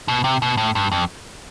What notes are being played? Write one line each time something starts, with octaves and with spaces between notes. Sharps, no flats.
B2
C3
B2
A2
G2
F2